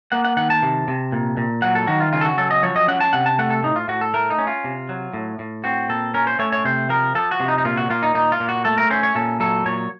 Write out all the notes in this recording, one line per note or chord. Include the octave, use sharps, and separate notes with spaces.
A#3 F#5
F#5
D#3 F#5
A5
C3
C3
A#2
A#2
F#3 F#5
A4
D#3 F#4
F4
C#3 F4
A4
F#4
F#3 A4
D#5
F3 C#5
D#5
C#4 F#5
A5
C3 F#5
A5
A3 F#5
A4
A2 D#4
F4
A2 F#4
A4
A3 A#4
D#4
C#4
F4
C3
F#3
A2
A2
C4 F#4
A#2 A4
C#4 A#4
C5
A3 C#5
C#5
C3 C5
F3 A#4
F3 A4
F#4
C3
D#4
D#4
A#2 F4
F#4
A#2 F4
D#4
A#2 D#4
F4
A#2
F#4
A3 A4
A#4
C#4 C5
C#5
A#2 A4
F#3 A4
A#2 C#5